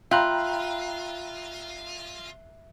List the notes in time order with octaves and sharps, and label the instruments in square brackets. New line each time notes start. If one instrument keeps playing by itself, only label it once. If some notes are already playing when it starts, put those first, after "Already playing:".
[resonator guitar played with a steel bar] F4 [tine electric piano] E5 F#6 [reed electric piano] G5 A#5 B5